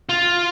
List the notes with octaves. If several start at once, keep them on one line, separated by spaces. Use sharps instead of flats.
F4